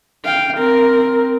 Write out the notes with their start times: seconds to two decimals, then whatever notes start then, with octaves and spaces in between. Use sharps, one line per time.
0.25 F5 G5
0.57 C4 A#4